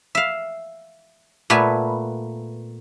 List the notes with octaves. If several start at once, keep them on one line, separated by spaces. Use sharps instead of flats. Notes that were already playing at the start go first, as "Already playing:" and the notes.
E5 F5
A#2 A3 B3 B4 G#5